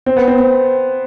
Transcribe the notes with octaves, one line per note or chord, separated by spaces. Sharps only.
C4
B3
C4
C4